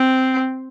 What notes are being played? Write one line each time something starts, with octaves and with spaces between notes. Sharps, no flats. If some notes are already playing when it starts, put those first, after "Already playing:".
Already playing: C4